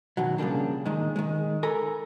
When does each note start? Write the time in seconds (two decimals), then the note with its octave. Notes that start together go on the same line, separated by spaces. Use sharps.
0.17 B2 D#3 F#3
0.38 C#3 F3 G3 A#3 D4
0.86 A#2 D#3 G#3
1.16 D#3 G#3
1.63 A4 A#4 G#5 A#5 B5